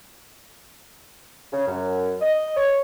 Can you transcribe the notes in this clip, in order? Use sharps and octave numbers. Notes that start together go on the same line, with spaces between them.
C#3
F#2
D#5
C#5